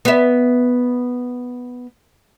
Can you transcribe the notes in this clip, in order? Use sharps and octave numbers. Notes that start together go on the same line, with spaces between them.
B3 E5